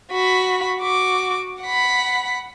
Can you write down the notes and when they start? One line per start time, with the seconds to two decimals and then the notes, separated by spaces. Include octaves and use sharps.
0.12 F#4 B5
0.78 F#4 D6
1.62 F#5 B5